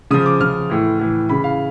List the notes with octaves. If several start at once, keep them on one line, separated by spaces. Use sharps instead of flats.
C#3 F3 D#6
D6
C#3 F3 F6
A2 E3
A2 E3
C#3 E3 B5
F5